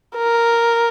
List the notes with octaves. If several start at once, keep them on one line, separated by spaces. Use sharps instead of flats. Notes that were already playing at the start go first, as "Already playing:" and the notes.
A#4